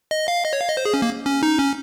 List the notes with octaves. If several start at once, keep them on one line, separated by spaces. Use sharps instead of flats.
D#5
F5
D#5
C#5
F5
D#5
C5
G#4
C#4
A#3
C#4
D#4
C#4